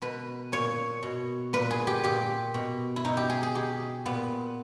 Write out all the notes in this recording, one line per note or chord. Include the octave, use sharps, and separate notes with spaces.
B2 B4
A#2 C#5
B2
A#2 B4
G#4
G4
A#2 G4
B2
E4
B2 D#4
G4
G#4
G#4
B2 G4
A#2 B3